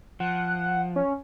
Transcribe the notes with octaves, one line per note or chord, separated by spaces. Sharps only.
F3 F#5
C#4